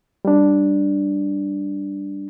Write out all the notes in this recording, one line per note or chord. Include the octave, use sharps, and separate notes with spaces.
G3 D4